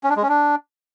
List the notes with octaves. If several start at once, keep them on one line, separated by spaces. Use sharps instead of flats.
C#4
D4
G#3
C#4
D4